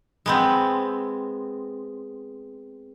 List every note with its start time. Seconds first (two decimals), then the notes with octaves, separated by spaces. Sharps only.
0.26 G#3 B3 C4